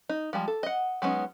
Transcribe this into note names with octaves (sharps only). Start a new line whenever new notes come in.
D#4
F3 G3 G#3
A4
D#5 F#5
F#3 G#3 B3 C#4 D#4